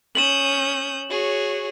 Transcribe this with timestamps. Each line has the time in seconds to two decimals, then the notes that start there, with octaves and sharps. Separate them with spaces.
0.15 C#4 D#6 G6 E7 F#7
1.10 F#4 G#4 C#5